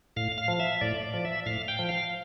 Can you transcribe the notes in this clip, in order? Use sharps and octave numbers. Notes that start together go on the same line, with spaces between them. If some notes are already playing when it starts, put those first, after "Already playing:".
A2 F5
F5
F3
E5
A2 D5
D5
F3
E5
A2 F5
G5
F3
F5